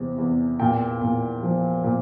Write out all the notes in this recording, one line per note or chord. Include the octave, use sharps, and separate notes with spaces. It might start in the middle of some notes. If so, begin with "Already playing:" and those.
Already playing: E2 C3
E2
A#2 G5
A#2
F3
A#2